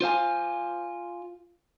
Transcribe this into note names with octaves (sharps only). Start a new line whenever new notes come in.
F4 C5 F5 G#5